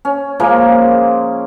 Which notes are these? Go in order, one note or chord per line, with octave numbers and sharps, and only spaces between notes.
C#4
A#2 F3 G#3 A#3